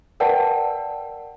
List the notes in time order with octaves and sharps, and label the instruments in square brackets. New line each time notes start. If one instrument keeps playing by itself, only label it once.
[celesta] A#4 B4 D5 F#5 G5 A5